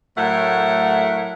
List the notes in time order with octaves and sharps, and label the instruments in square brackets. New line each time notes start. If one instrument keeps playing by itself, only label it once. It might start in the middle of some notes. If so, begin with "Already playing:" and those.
[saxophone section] A2 F#3 A3 A#4 E5 F#5